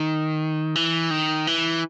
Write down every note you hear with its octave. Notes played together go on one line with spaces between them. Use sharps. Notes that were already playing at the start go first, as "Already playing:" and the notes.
Already playing: D#3
E3
D#3
E3